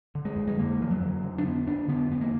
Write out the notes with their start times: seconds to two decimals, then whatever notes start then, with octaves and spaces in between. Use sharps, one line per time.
0.15 D3
0.25 G#3
0.36 F2
0.48 G#3
0.58 D3 A#3
0.80 F2 F3
0.91 F#3
1.02 F2
1.23 D3
1.38 D4
1.45 D3 B3
1.67 F2 D4
1.88 D3 B3
2.11 F2 B3
2.21 A#3